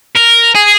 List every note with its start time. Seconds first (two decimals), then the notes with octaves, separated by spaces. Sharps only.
0.15 A#4
0.55 G#4